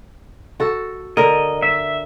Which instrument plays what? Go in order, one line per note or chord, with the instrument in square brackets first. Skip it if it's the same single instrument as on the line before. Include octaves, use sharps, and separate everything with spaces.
[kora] F#4 A4
[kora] D3 A#4 [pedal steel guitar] D#5
[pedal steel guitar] E5